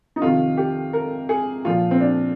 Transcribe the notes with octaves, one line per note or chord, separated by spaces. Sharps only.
D#4
F2 C3 D#3 F4
G4
A#4
G#4
A#2 F3 F4
C4
D4